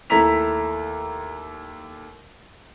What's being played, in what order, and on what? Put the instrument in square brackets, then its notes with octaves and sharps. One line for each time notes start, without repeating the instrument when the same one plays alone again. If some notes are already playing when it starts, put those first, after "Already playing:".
[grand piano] D#2 A3 E4 A#5 B6 F7